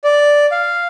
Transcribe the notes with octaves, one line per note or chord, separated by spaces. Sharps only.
D5
F5